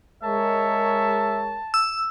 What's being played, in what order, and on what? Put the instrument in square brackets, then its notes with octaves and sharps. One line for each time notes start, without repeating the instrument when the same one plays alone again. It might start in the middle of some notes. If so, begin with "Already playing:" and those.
[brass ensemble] G#3 A#4 C#5 [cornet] E5 [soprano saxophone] A5
[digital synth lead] E6